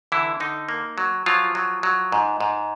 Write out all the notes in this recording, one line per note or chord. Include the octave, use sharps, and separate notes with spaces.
D3 E3 E4
D3 D#4
A#3
F#3
F3 F#3 F4
F#3
F#3
G#2
G#2